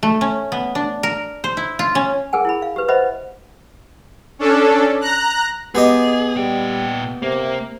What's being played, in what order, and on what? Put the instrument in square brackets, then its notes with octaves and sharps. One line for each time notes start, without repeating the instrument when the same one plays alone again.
[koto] A3
C#4
B3
D4
A#4
C5
E4
F4
C#4
[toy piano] G#4 A#4 F#5 G#5
E4 G#4 B5
F5
G4 B4
B4 C5 D#5 E5 F#5 B5
[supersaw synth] C#4 D4 A4
A#5 F#6
[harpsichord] B3 G4 D#5 [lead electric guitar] G#4
[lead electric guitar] A#2 G5 [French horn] G3
[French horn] C3 [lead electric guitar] A#3